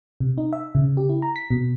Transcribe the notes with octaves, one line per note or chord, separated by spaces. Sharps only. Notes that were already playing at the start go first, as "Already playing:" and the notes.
C3
D#4
E5
C#3
G4
E4
A#5
B6
B2